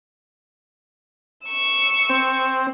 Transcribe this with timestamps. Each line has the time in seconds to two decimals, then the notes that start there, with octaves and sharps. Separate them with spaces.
1.47 C#6 E6
2.10 C4